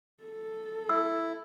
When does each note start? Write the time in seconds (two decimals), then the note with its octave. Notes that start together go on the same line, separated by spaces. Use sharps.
0.23 A4
0.89 E4 E6